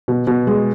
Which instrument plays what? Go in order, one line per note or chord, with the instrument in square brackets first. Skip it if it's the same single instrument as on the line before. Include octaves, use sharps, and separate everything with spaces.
[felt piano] B2
B2
G#3